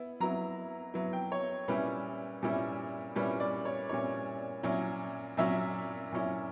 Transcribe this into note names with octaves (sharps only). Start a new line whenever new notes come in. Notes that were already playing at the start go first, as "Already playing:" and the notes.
Already playing: B3 E4
F#3 B3 E4 A#5
F#3 B3 E4
G5
C#5
A#2 G3 C#4 E4 B4
A#2 G3 C#4 E4
A#2 G3 C#4 E4 B4
D5
C#5
A#2 G3 C#4 E4 C#5
A#2 F#3 C#4 E4
A#2 F#3 C#4 E4 E5
A#2 F#3 C#4 E4